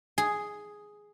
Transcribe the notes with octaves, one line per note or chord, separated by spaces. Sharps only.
G#4